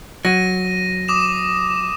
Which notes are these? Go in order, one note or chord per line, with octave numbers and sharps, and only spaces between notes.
F#3 A#6 D#7
D6 D#6 E7